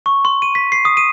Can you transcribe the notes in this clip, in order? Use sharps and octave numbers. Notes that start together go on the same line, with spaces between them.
C#6
C6
D#7
B6
C7
D#6
D#7